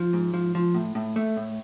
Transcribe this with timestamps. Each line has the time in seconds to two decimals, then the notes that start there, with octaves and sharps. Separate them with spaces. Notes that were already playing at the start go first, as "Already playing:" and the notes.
Already playing: F3
0.13 G#2
0.34 F3
0.55 F3
0.74 A2
0.95 A2
1.16 A3
1.37 A2